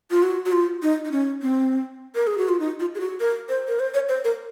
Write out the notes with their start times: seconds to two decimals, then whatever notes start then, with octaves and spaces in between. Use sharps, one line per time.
0.11 F4
0.23 F#4
0.45 F#4
0.52 F4
0.82 D#4
1.05 D#4
1.12 C#4
1.42 C4
2.15 A#4
2.27 G#4
2.38 F#4
2.49 F4
2.60 D#4
2.80 F4
2.95 G#4
3.00 F#4
3.20 A#4
3.49 C5
3.68 A#4
3.79 C5
3.94 C#5
4.09 C5
4.24 A#4